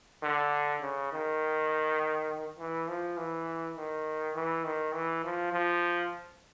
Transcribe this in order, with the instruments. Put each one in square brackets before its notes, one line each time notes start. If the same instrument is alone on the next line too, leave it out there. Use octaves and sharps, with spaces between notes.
[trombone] D3
C#3
D#3
E3
F3
E3
D#3
E3
D#3
E3
F3
F3